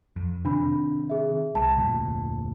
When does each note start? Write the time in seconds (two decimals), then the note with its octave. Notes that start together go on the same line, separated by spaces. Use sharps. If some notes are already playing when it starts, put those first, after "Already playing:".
0.16 F2
0.45 C3 D#3 D4 B5
1.10 G#4 E5
1.55 C2 A5
1.78 F1 D2 A#2